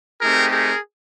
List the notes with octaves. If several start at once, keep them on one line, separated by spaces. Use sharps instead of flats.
A3 C4 D#4 G4 G#4 A#4
G#4 A#4